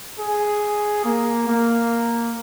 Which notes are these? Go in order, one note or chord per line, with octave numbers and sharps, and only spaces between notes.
G#4
A#3
A#3